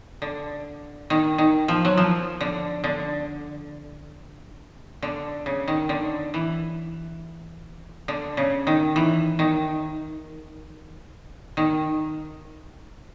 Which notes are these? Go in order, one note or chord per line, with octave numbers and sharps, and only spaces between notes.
D3
D#3
D#3
F3
F#3
F3
D3
D3
D3
C#3
D#3
D3
E3
D3
C#3
D#3
E3
D#3
D#3